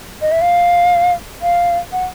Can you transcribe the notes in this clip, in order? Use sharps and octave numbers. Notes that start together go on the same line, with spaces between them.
D#5
E5
F5
F5
F#5